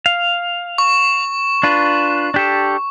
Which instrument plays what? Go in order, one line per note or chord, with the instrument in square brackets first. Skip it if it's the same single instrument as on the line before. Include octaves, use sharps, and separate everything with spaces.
[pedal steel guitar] F5
[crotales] C#6
[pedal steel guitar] D4 F4 B4
D4 G4 A4